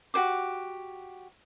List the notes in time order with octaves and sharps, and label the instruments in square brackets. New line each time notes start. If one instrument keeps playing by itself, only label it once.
[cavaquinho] F#4 G4 C5 D6